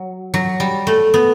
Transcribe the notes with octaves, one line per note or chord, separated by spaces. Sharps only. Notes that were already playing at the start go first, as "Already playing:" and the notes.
Already playing: F#3
F#3
G3
A3
B3